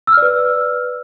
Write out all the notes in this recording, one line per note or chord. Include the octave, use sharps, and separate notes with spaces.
B4 D5 E6 F6